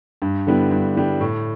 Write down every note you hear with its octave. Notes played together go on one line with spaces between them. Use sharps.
G2
D3 G3 B3 E4
G2
D3 G3 B3 E4
A2